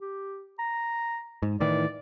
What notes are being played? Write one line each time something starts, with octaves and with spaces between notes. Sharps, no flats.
G4
A#5
G#2
A2 D#3 E3 D5